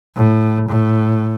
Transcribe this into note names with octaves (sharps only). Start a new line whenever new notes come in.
A2
A2